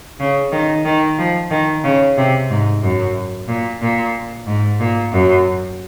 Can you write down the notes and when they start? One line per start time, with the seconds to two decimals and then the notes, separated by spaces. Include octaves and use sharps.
0.20 C#3
0.52 D#3
0.85 D#3
1.18 F3
1.51 D#3
1.84 C#3
2.17 C3
2.50 G#2
2.82 F#2
3.48 A#2
3.82 A#2
4.47 G#2
4.80 A#2
5.13 F#2